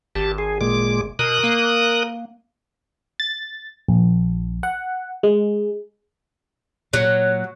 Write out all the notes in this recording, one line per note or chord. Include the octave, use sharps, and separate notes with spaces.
G#1 G4 A5
G#4
A#2 G#3 D6
B2 A#4 D#6 F#6
A#3
A6
A#1
F#5
G#3
A#2 F#3 C#5